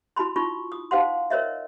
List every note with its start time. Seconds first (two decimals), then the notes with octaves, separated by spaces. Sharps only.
0.16 E4 F#4 A5 B5 C6
0.36 D#4 F4 B5 C#6
0.72 D#6
0.91 D#4 C5 F5 F#5 C6
1.30 A#4 C5 C#5 D#5 E5